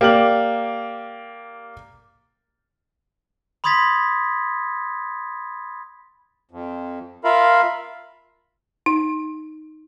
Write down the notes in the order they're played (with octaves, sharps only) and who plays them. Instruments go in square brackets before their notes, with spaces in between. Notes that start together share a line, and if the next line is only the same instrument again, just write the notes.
[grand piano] A#3 G4 D5 F6 F#7
[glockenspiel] B5 C6 D#6 G#6 A6 B6
[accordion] F2
F4 A#4 E5 F5 B5
[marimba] D#4